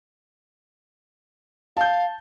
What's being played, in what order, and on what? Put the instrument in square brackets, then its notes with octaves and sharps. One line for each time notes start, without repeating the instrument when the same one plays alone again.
[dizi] F5 [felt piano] A5 G6